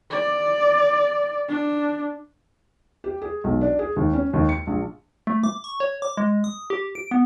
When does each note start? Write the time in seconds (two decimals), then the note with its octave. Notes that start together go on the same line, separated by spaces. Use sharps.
0.11 D5
1.49 D4
3.04 G4
3.22 G#4
3.44 B1
3.61 D4
3.79 G#4
3.96 D#2
4.13 C#4
4.33 D#2
4.49 C#7
4.67 A#1
5.27 A3
5.44 D6
5.64 C#6
5.80 C#5
6.02 D6
6.17 G#3
6.44 D#6
6.70 G4
6.95 D7
7.11 B3